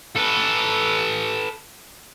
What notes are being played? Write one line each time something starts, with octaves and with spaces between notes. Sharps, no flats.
A4 B4